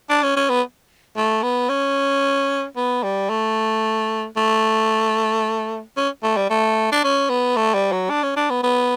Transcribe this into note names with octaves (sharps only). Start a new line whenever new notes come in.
D4
C#4
C#4
B3
A3
B3
C#4
B3
G3
A3
A3
C#4
A3
G3
A3
D4
C#4
B3
A3
G3
F#3
D4
C#4
D4
B3
B3